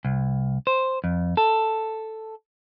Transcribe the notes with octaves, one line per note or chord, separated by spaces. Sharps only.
C2
C5
F2
A4